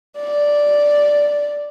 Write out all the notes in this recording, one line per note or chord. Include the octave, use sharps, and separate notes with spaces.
D5